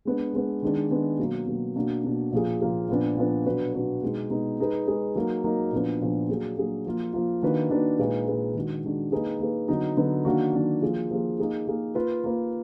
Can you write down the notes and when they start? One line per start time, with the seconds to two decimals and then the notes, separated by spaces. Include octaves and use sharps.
0.05 G#3 B3 D4
0.34 G#3 B3 D4
0.62 D#3 G#3 B3 D4
0.90 D#3 G#3 B3 D4
1.19 B2 F#3 A#3
1.47 B2 F#3 A#3
1.76 B2 A#3 D4 F#4
2.04 B2 A#3 D4 F#4
2.32 A#2 F3 A#3 F4 G#4
2.61 A#2 F3 A#3 F4 G#4
2.89 A#2 F3 B3 D4
3.17 A#2 F3 B3 D4
3.45 B2 F#3 D4 F#4 B4
3.74 B2 F#3 D4 F#4 B4
4.02 B2 G#3 B3 D#4
4.30 B2 G#3 B3 D#4
4.59 G#3 D#4 G#4 B4
4.87 G#3 D#4 G#4 B4
5.16 F#3 A#3 D#4 A#4
5.44 F#3 A#3 D#4 A#4
5.72 A#2 F3 B3 D4
6.01 A#2 F3 B3 D4
6.29 F#3 A#3 D4 G#4
6.57 F#3 A#3 D4 G#4
6.85 F3 A#3 F4
7.13 F3 A#3 F4
7.43 D#3 A#3 D4 F#4 B4
7.70 D#3 A#3 D4 F#4 B4
7.99 A#2 G#3 D#4 G#4 B4
8.27 A#2 G#3 D#4 G#4 B4
8.55 D#3 G#3 D4 F#4
8.84 D#3 G#3 D4 F#4
9.12 A#3 D#4 G#4 B4
9.40 A#3 D#4 G#4 B4
9.68 D3 F#3 B3 D#4
9.97 D3 F#3 B3 D#4
10.25 D#3 F#3 A#3 D4 F#4
10.53 D#3 F#3 A#3 D4 F#4
10.82 F3 A#3 F4 G#4
11.11 F3 A#3 F4 G#4
11.39 A#3 D#4 G#4
11.68 A#3 D#4 G#4
11.95 A#3 F4 B4
12.24 A#3 F4 B4